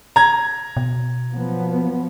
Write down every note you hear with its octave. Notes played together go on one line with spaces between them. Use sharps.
A#5 G#6
B2
F3 F#3 B3